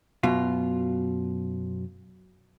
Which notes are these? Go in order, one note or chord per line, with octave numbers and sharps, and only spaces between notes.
F#2 B2 F4